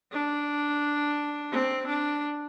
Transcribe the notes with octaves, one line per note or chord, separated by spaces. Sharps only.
D4
C4
D4